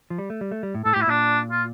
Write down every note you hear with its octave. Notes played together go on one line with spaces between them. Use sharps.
F3
G3
A3
G3
A3
G3
A2
A2 A4
G4
A2
E4
A#2 D4
F4